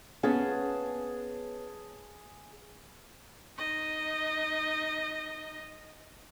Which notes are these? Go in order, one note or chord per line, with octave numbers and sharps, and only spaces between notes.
B3 C#4 G#4 A5
D#4 D#5